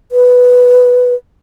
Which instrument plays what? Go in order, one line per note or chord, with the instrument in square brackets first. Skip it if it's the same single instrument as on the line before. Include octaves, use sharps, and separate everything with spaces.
[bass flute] B4